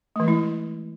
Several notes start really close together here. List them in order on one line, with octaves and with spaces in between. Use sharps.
A3 E3 G#3 E4